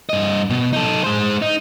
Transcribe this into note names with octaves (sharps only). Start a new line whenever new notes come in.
G2 D#5
B2
D#4 A4
G#3 C5
D#4